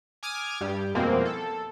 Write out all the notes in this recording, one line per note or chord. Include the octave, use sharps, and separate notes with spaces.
G#5 D6 D#6 F6 G#6
G2 G3 G4
F2 B2 E3 G#3 A#3 C4
A4